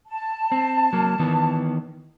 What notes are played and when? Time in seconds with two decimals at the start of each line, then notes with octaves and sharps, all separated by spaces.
0.07 A5
0.52 C4
0.93 F#3 A#3
1.19 D#3 E3 B3